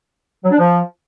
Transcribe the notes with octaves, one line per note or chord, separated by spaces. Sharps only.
F#3
D4
F3